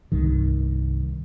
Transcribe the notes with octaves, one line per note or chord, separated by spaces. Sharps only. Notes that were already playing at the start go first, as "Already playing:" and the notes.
C2 G2 D#3